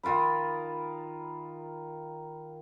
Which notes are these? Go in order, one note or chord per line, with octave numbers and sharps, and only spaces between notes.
D#3 F4 A#4 B5